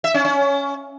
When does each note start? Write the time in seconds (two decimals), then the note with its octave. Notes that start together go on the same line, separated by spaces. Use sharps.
0.04 E5
0.14 C#4
0.25 C#4